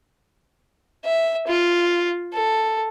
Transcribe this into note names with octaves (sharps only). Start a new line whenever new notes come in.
E5
F4
A4